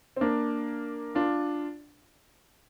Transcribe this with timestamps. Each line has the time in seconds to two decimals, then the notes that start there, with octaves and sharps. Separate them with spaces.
0.16 C4
0.21 A#3 D4
1.15 D4 F4